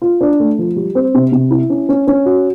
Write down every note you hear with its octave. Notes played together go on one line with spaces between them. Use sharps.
F4
D4
A3
F3
G3
C4
C3
C3
E4
C#4
C#4
C#4
F#4